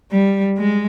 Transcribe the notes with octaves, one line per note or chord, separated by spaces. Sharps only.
G3
G#3